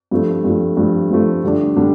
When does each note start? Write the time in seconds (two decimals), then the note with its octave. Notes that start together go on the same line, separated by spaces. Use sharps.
0.11 G2 F3 A3
0.44 G2 F3 A3
0.77 G2 F3 A3
1.11 G2 F3 A3
1.44 D3 G3 D4
1.76 D3 G3 D4